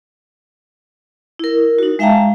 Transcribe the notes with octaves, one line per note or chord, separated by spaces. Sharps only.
E4 A#4
D#4 F#4
G#3 E5 F5 G5 A5 A#5